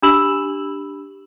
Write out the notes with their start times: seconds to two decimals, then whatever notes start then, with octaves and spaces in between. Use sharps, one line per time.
0.02 D4 G4 B5 E6 E7 F#7